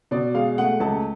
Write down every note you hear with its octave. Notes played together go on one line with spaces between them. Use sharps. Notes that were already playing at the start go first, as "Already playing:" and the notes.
B2 D5
G#3 F5
A3 F#5
C#2 A5